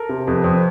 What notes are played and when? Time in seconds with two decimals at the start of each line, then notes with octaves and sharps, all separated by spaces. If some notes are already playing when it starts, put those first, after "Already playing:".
Already playing: A4 A#4
0.09 C3
0.27 F2 B4
0.44 F2